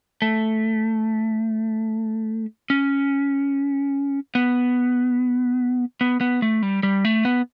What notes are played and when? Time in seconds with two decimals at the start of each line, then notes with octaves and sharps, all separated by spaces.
0.22 A3
2.70 C#4
4.35 B3
6.01 B3
6.21 B3
6.42 A3
6.62 G3
6.83 G3
7.05 A3
7.25 B3